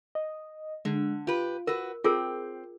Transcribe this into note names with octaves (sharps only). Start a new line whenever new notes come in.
D#5
D3 G#3
F4 G4 B4
F#4 A#4 B4
C4 F4 G#4 A#4 G5